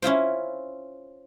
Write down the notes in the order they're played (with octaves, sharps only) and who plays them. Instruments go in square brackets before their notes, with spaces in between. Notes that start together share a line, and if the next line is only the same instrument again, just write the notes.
[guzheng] C#4 E4 F4 C5